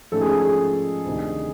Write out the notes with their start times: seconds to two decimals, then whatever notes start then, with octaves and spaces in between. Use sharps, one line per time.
0.12 G#2 F3 A3 C#4 A4
0.21 G#4
0.39 G#4
1.06 D2 C3 D#3